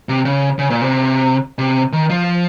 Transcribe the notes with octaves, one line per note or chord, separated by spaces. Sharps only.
C3
C#3
C#3
A#2
C3
C3
D#3
F3